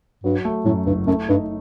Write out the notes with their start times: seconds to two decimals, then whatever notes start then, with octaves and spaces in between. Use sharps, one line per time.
0.24 G2 F#3
0.45 A3
0.65 F#2 A2
0.86 F#1 G2
1.07 F#2 A3
1.28 G2 D#4